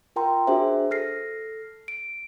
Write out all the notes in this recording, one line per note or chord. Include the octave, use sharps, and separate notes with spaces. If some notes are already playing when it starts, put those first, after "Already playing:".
F4 A#4 G5 A#5 C6
D4 F#4 G#4 C5 E5
A4 F6 A#6 C7
D7